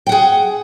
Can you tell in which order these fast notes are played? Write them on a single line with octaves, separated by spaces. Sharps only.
G5 F#5 G#4